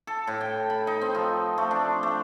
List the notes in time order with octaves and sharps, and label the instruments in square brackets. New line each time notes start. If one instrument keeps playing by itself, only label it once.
[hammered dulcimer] A4
A2
G5
B5
D#4
C4
F3
A3
D4
A3